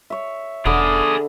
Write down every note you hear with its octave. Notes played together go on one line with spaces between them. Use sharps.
C#5 E5
E1 D3 G#4 D5 B5 D#6